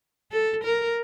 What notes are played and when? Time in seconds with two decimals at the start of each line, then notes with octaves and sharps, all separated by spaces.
0.32 A4
0.64 A#4